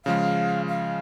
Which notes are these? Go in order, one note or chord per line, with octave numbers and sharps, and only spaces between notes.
C#3 F3 G#3 F5
F5